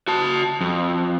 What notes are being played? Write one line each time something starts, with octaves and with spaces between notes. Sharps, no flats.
F#4 A5
F2